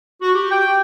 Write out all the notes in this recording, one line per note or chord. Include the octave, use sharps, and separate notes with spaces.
F#4
G4
G5